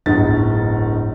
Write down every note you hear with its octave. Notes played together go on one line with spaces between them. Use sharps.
D1 G1 D#4 A6